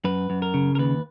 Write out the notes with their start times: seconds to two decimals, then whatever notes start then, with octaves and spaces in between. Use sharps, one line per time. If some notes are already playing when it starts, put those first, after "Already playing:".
0.04 F#2 B4
0.30 F#2
0.42 A#4
0.54 C#3
0.75 A#4
0.79 D#2 B4